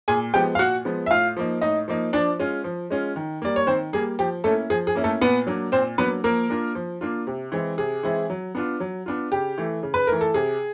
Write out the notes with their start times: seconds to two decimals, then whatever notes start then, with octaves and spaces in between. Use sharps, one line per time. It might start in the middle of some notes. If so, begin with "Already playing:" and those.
0.08 A#2 G#4 G#5
0.34 F3 G#3 B3 G4 G5
0.55 F5
0.59 A#2 F#4 F#5
0.85 F3 G#3 B3
1.06 E5
1.10 A2 F4 F5
1.37 F3 A#3 D#4
1.61 A2 D#4 D#5
1.88 F3 A#3 D#4
2.13 F3 D4 D5
2.39 G#3 C#4 F4
2.64 F3
2.90 G#3 C#4 F4
3.16 D#3
3.42 G3 A#3 D5
3.56 C#5
3.67 D#3 C4 C5
3.93 G3 A#3 G#4
4.19 F3 G4
4.44 A3 A#3 C#4 E4 A4
4.70 F3 G#4
4.87 G#4
4.95 A#3 C#4 E4
5.04 A3 A4
5.21 A#2 B3 B4
5.47 F#3 A#3 D4
5.72 A#2 C4 C5
5.98 F#3 A#3 B3 D4 B4
6.24 F3 A#3 A#4
6.50 A#3 D4 F4
6.75 F3
7.01 A#3 D4 F4
7.27 C3
7.52 E3 G#3 C4 E4
7.78 C3 G#4
8.03 E3 G#3 C4 E4
8.30 F#3
8.55 B3 D4 F4
8.80 F#3
9.06 B3 D4 F4
9.32 C#3 G4
9.58 E3 A3
9.83 C#3
9.94 B4
10.07 E3 A3 A#4
10.21 A4
10.34 C3 G#4